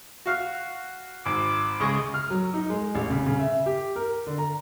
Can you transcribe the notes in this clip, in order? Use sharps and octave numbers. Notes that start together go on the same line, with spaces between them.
F#4 F5 F6
G#1 D6
C#2 G#3 C#6 D#6
F6
F#3
D#4
G#3
A1
C#3
C#3
E5
G4
A#4
D3
A#5